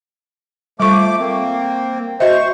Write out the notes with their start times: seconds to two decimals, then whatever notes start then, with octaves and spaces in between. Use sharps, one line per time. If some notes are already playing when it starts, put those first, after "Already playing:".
0.80 F3 G3 A3 C#6 D6
1.19 A#3 C4
2.20 F#4 C5 D#5 E5 C#6